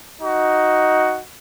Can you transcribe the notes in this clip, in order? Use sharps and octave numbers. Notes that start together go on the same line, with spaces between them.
D#4 F#4